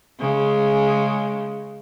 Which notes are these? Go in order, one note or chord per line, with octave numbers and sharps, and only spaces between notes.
C#3 G#3